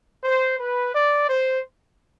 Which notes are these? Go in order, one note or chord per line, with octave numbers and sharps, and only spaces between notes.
C5
B4
D5
C5